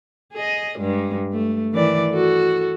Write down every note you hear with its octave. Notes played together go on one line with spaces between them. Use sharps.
G#4 D#5
G2 G#3
A3
D#3 E3 D5
F#4 A4